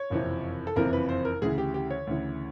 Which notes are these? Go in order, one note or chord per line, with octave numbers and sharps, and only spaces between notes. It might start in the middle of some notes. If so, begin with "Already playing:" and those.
Already playing: C#5
F#1 F2 C3 E3
A4
F#1 F2 C3 E3 A#4
B4
C5
A#4
D2 C#3 E3 G#4
G4
G4
C#5
D2 C#3 E3